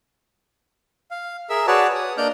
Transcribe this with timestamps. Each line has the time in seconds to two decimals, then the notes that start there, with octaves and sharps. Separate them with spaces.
1.11 F5
1.50 G#4 A#4 E5 E6
1.67 F#4 G#4 B4 C#5 D5 A5
1.95 D#6
2.17 A#3 D4 D5 D#5 F6 G6